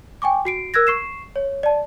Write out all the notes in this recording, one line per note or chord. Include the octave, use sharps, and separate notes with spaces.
G5 G#5 C#6 D6
F#4 C7 D7
A#4 E6 F#6 G#6 A#6
C#6 C7 E7
C#5
D5 A5